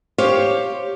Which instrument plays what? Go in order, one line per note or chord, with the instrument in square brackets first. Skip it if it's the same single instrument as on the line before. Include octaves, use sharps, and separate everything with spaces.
[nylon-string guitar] G4 C5 C#5 F5